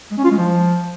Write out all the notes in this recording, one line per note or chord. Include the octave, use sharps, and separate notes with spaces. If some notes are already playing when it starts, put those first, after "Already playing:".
G#3
C#4
F4
G#3
F3